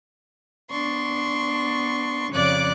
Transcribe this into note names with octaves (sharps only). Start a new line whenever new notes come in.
B3 D4 C6 C#6
F2 C#3 C#5 D5 D6 F#6